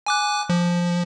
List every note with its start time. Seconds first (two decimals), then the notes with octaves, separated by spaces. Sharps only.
0.06 G#5 D6 F#6
0.49 F3